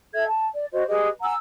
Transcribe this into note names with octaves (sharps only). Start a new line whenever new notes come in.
A4 E5 G#6
A5
D5
F#4 C5 D#5
G4 G#4 B4 D#5
F#5 G#5 A#5 E6